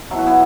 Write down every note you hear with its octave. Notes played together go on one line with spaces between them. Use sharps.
B2 F#3 E4
F#4
B3 E4